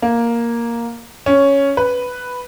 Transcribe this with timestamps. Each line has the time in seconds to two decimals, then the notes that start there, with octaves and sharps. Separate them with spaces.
0.02 A#3
1.26 C#4
1.77 B4